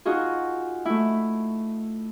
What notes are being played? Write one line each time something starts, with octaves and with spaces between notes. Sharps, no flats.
D#4 F4 F#4 G#4
A3 E4